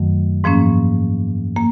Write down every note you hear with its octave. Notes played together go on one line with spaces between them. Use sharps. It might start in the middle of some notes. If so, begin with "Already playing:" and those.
Already playing: F#2 D#3 F#3 A3
G#2 F3 A#3 C#4
A#3